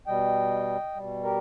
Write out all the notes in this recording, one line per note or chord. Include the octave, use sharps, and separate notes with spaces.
B2 G3 D#5 G5
B2 G3
G4 A#4